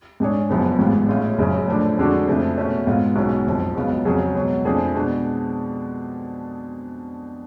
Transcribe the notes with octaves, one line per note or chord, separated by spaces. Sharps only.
G#2 G#3 D4 G#4 C#5
F#1 F#2 C#3 F3 B3
A1 G#2 G#3 B3 F4
A2 G#3 C#4 F4
F#1 F#2 C#3 G#3 C#4
A2 F3 A3 D4
F2 D3 G#3 D4 F#4
F2 C#3 F3 A3
B2 A3 C#4
G#2 G#3 B3 F4
B1 B2 G#3 C#4
F#1 F2 F3
C#2 C#3 F#3 B3 F4
F2 C#3 F#3 C#4 G#4
C#2 B2 F#3
F2 F3 A3 D4 G#4
B2 G#3 D4